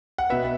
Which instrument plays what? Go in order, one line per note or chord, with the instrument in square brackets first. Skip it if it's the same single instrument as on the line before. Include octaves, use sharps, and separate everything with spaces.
[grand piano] F#5
[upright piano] B2 [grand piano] B4 E5